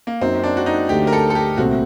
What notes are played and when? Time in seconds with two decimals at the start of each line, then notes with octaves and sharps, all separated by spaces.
0.07 A#3
0.21 F#2 F#3 A#3 C4 D#4
0.44 D4
0.57 F#4
0.66 D#4
0.89 D2 D3 A3 G4
1.07 A#4
1.13 A4
1.30 A4
1.35 G4
1.58 C2 A#2 A3 C4 F#4